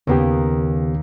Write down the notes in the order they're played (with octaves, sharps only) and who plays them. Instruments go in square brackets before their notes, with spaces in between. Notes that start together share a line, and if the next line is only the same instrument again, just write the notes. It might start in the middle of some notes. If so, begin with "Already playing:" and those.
[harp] D#2 A#3 [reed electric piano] C#3 B3 G4